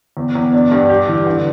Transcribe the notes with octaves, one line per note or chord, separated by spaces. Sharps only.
E2
E2
D4
G2
G4
E3
D3